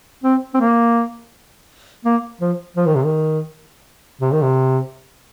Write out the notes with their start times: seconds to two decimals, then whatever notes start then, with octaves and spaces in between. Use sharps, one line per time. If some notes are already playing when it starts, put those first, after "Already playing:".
0.24 C4
0.54 C4
0.60 A#3
2.05 A#3
2.40 F3
2.76 F3
2.86 D#3
2.95 C3
3.05 D#3
4.21 C3
4.32 D#3
4.42 C3